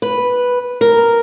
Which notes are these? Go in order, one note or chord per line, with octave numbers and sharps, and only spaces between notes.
B4
A#4